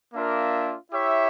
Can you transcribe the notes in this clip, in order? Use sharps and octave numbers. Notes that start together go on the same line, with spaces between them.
A#3 D4 F4 A#4 E5
E4 G4 C#5 E5